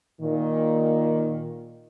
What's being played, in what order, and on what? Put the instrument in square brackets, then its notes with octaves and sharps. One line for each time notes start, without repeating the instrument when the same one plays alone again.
[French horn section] A#2 D#3